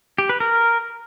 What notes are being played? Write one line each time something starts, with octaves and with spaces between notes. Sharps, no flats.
G4
B4
A#4